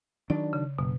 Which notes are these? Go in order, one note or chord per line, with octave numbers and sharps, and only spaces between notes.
D#3 F#3 D4 D5
C#3
F#1 B2